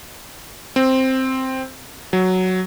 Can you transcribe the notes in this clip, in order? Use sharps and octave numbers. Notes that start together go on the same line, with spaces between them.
C4
F#3